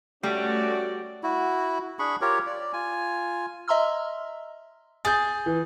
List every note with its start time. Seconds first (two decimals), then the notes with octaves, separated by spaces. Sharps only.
0.23 G3 A3 C#4 F#4 D5
1.23 E4 F#4
1.99 D4 G#4 B5 C#6
2.21 F4 G4 A#4 C#5
2.46 D5
2.73 F4 G#5
3.68 D#5 E5 A#5 C6 E6 F6
5.05 G#4 G6 A6
5.46 E3